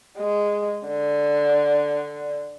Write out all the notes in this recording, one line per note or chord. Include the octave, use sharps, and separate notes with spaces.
G#3
D3